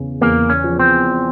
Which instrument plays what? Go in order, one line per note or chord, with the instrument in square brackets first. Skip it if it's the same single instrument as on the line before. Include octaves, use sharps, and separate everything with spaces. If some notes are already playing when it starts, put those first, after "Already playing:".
Already playing: [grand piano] E2 C#3
[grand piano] E2 [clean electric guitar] A#3
[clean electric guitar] C#4
[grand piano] F3
[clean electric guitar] C4